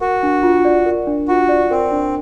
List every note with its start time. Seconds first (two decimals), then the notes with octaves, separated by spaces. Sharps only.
0.01 F#4 A#4
0.23 D4
0.43 F4
0.65 D5
0.86 A#4
1.07 D4
1.28 F4 F#4
1.49 D5
1.71 C4 A#4
1.92 D4